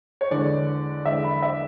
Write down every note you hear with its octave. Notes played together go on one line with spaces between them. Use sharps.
C#5
E2 D3 G#3 D5
E2 D3 G#3 E5
B5
E5